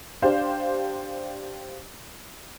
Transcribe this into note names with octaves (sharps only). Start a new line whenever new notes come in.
D4 G4 C5 F5